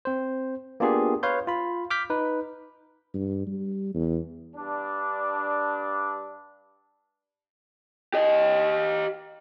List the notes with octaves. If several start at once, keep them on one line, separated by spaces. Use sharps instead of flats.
C4 C5
A#3 B3 D4 F4 G4 G#4
B4 C#5 F5 C6 G6
F4 B5
D6 F6 G6 B6
D#4 B4
G2
G3
E2
G2 D4
G4 D#5